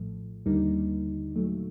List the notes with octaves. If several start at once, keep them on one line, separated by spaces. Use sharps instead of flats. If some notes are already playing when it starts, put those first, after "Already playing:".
Already playing: A#1 A2 F3 A3
D#2 D3 G3 A#3 D#4
A#2 F#3 A3